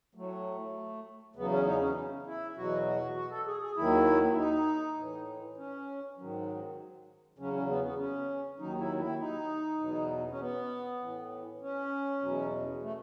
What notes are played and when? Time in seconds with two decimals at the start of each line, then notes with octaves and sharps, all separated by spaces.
0.15 A2 F#3 A3
1.36 E2 C#3 F#3 B3
1.51 C#4
1.66 D#4
1.80 C#4
2.26 E4
2.55 E2 B2 F#3 F#4
2.86 F#4
3.16 F#4
3.31 A4
3.47 G#4
3.61 G#4
3.77 D#2 D#3 F#3 E4
4.32 E4
4.37 D#4
4.97 A2 E3
5.58 C#4
6.17 G#2 D#3 F#3
7.38 E2 C#3 F#3 C#4
7.53 C#4
7.69 B3
7.84 B3
7.98 C#4
8.59 D#2 D#3 F#3 D#4
8.79 E4
9.00 E4
9.19 D#4
9.80 E2 B2 F#3
10.31 C#4
10.40 B3
11.00 A2 E3
11.61 C#4
12.22 E2 B2 F#3
12.82 A3